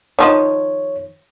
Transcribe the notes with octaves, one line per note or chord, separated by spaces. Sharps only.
D#3 F3 D#4 C#5